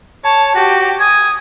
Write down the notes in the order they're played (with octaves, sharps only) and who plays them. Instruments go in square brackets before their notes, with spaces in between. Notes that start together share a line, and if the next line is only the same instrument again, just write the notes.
[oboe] C#5 [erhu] A5
[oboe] F#4 [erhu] G4
[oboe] G#5 [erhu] D#6